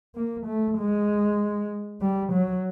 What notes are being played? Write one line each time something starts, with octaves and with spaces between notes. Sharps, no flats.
A#3
A3
G#3
G3
F#3